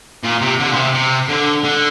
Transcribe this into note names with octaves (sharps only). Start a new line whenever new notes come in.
A#2
C3
D3
A#2
C3
C3
D3
D3